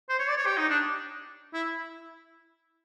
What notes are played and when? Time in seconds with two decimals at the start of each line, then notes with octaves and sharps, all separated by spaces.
0.09 C5
0.19 C#5
0.28 D5
0.37 C#5
0.46 G4
0.57 D#4
0.70 D4
1.54 E4